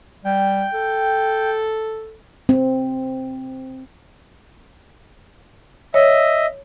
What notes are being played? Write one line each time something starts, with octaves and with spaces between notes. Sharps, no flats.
G3 G5
A4
C4
C#5 D#5 E5